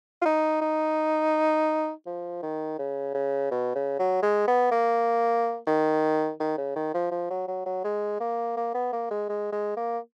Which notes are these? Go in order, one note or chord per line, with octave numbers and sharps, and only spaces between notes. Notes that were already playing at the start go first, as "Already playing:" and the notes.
F4
D#4
D#4
F3
D#3
C#3
C#3
B2
C#3
F#3
G#3
B3
A#3
D#3
D#3
C#3
D#3
F3
F3
F#3
F#3
F#3
G#3
A#3
A#3
B3
A#3
G#3
G#3
G#3
A#3